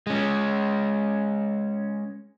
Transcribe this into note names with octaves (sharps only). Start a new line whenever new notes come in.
G#3 C#4